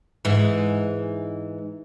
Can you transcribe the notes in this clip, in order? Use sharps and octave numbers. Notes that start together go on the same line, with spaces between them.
G#2 E3